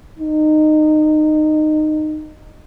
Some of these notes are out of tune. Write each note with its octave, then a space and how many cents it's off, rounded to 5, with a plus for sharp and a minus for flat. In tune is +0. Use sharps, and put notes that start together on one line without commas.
D#4 -20